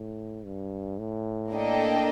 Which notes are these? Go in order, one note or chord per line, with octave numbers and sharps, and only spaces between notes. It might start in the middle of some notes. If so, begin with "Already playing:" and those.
Already playing: A2
G2
A2
A#3 D4 A4 D#5 G5